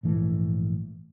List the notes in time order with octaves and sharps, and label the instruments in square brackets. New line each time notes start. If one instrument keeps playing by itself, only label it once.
[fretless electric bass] A#1 G#2 E3 A3